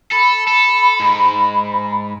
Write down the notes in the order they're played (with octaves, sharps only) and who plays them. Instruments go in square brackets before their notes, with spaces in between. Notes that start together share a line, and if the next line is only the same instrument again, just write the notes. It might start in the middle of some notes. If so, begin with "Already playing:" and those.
[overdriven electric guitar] A4 [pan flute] B5
[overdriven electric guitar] A4
G#2